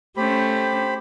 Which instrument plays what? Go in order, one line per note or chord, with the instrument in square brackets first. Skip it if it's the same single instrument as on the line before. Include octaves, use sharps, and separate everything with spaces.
[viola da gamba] A3 C#4 [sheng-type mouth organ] G4 C5 B5